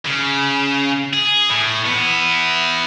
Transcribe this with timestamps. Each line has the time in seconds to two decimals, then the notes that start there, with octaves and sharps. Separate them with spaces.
0.05 C#3
1.13 G#4
1.50 A2
1.86 B3 E4